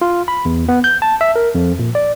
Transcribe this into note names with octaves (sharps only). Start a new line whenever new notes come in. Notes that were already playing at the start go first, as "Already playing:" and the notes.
F4
B5
E2
B3
G6
A5
E5
A#4
F2
A#2
D5